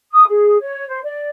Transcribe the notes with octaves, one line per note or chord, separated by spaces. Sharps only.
D#6
G#4
C#5
C5
D5